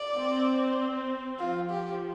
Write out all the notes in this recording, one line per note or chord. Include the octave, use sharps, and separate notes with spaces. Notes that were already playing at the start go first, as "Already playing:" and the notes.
Already playing: D5
C4
F3 F4
G4